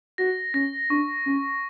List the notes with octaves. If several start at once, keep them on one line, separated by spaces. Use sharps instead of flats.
F#4 A#6
C#4 A#6
D4 C#6
C#4